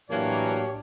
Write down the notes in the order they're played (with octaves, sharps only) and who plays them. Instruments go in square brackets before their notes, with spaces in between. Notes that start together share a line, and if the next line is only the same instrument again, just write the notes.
[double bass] A2 D4 [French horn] E3 [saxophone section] F#3 A#3 [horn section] G4 C#5